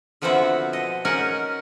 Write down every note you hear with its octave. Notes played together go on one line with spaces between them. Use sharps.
D3 F3 B3 C4 E4 F#4
B2 D#5
C#4 D#4 A#4 F#5 G#5